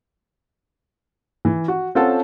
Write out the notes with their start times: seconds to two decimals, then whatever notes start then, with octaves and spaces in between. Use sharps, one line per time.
1.45 E3
1.68 F#4
1.95 C4 C#4 F4 A4 F#5 A5